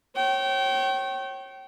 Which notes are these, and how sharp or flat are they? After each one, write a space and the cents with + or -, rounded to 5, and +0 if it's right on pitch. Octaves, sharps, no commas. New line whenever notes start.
C#5 -30 G5 -30